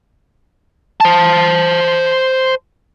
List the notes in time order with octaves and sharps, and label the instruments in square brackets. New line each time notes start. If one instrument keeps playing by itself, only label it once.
[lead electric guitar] C5 A5